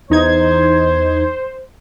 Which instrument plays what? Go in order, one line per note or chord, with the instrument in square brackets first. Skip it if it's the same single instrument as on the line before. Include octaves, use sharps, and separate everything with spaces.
[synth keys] E2 D#4 G#6 [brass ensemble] C5